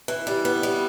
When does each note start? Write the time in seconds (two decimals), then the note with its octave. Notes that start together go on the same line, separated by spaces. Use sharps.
0.08 E3
0.27 G3
0.45 B3
0.63 G3